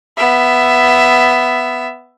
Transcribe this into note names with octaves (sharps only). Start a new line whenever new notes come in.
B3 E5